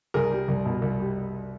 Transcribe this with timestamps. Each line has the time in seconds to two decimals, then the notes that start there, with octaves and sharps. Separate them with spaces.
0.14 C2 G#4 A#4
0.31 G3
0.48 C2
0.66 B2
0.82 C2
0.99 G3